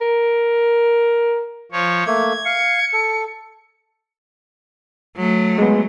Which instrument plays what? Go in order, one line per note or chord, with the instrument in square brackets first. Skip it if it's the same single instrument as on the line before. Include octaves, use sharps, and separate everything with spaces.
[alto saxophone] A#4
[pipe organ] F3 C#5
[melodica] A3 A#3 [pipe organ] G#6
[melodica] F5 [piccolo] C#7
[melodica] A4
[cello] F#3 A3
[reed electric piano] G#3 B3